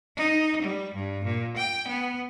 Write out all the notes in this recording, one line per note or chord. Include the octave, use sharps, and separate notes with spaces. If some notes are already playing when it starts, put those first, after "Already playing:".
D#4
G3
G2
A#2
G5
B3